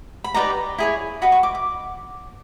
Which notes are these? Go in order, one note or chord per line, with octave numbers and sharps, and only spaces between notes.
B5
D#4 G4 B4 D5 A#5
E4 G#4 C#5
F#4 B4 D#5 B5
C#6
D6
D6